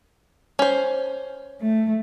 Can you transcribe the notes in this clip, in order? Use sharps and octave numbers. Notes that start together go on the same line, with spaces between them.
C#4 C5
A3